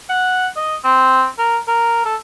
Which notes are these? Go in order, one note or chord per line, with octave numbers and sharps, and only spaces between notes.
F#5
D#5
C4
A#4
A#4
A4